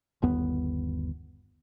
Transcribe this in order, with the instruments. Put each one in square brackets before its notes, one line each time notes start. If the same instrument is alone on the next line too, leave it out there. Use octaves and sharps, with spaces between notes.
[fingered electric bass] G1 D#2 B3